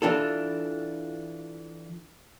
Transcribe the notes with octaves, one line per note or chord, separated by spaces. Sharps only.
E3 D4 F4 A4